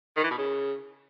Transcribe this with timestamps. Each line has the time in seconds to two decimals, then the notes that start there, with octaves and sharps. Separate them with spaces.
0.17 D#3
0.24 E3
0.31 B2
0.38 C#3